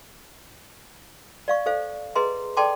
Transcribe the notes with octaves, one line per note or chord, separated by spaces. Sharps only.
D5 F5 C#6
A4 C5 F5
G#4 B4 D#5 A#5 C6
A4 D5 G5 A5 C6 D6